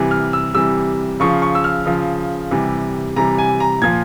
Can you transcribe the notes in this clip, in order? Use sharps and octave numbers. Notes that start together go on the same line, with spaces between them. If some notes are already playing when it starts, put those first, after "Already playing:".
Already playing: C3 E3 G3
F6
E6
C3 E3 G3 E6
C#3 F3 C#6
C#6
E6
F6
C#3 F3
C3 E3 G3
C3 E3 G3 A#5
G#5
A#5
A#2 F3 G#6